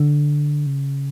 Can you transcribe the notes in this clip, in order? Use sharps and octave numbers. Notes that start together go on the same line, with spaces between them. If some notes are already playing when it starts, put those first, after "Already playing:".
Already playing: D3
C#3